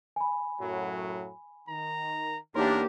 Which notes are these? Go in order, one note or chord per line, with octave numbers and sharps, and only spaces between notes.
G#5 B5
F#2 A2 F#3
D#3 A#5
E2 A#3 D4 D#4 G4 A#4 C#5 C6